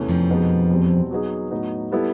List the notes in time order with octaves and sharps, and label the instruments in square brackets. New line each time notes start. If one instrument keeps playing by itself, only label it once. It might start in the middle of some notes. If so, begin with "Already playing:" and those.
Already playing: [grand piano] E2 C3 E3 A3 C#4
[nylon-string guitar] F2 F3
[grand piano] B2 G#3 B3 D#4
E2 B2 G3 C4
F#3 B3 D#4 G#4
A2 F#3 B3 D#4
G3 B3 E4 A4